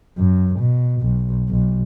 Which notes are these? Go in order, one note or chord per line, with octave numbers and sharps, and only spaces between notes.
F#2
B2
B1
B1